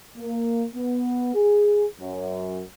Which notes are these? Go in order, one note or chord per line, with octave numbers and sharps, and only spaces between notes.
A#3
B3
G#4
F#2